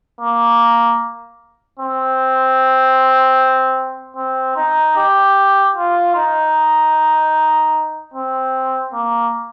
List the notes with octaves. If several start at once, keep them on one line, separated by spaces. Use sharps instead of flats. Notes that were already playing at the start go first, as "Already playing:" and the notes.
A#3
C4
C4
D#4
G4
F4
D#4
C4
A#3